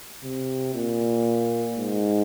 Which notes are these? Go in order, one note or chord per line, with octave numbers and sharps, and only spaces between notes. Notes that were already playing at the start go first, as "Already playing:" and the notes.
C3
A#2
G#2